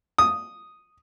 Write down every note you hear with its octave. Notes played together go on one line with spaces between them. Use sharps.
D#6